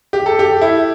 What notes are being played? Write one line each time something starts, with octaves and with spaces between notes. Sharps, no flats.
G4
A4
G4
E4